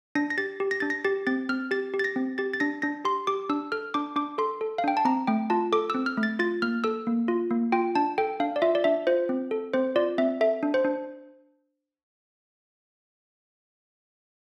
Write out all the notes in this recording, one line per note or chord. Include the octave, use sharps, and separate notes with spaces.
D4 A#6
A#6
G4 A6
G4
A#6
D4 A6
A#6
G4 A6
C4 A6
C4 F6
G4 A6
G4
A6
A#6
C4
G4 A6
A6
D4 A#6
D4 A#6
G4 C6
G4 D6
D4 E6
A4 F6
D4 D6
D4 D6
A4 C6
A4
F5
D4 G5
A5
C4 A#5
A3 G5
F4 A5
A4 D6
C4 E6
F6
A3
A6
F4 A6
A#3 F6
A4 E6
A#3
F4
A#3
F4 G5
D4 A5
A4 G5
D4 F5
D5
F4 E5
D5
D4 E5
F4 C5
C4
A4
C4 C5
F4 D5
C4 E5
A4 E5
D4
C5
D4